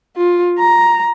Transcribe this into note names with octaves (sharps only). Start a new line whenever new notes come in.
F4
A#5